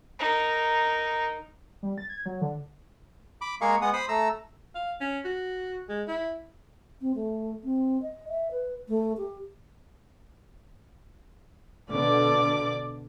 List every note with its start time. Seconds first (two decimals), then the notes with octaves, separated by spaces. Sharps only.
0.19 D#4 A#4
1.83 G3
1.98 A6
2.09 G#6
2.26 F#3
2.41 D3
3.41 B5 D6
3.61 G#3 A#3 G#4 A#4 F5 C#6
3.82 G#3 B3 F#5 D#6
3.93 C5 B5 D#6
4.09 A3 A#5 E6
4.75 F5
5.01 C#4
5.25 F#4
5.89 G#3
6.08 E4
7.01 C4
7.15 A3
7.64 C4
8.02 D#5
8.29 E5
8.51 B4
8.88 A3
9.17 G4
11.91 B2 D3 D5 D6